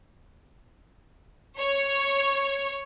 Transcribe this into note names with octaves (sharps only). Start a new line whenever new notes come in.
C#5